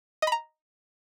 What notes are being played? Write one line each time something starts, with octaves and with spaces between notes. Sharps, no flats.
D#5 A#5 B5